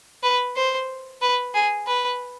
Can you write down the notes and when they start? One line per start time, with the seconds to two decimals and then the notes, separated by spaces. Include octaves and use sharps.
0.23 B4
0.56 C5
1.21 B4
1.54 G#4
1.87 B4